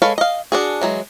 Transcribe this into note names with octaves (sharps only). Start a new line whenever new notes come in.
G#3 A4 B4 C#5 F5
D#5 F5
D4 F#4 G#4
E3 F#3 G#3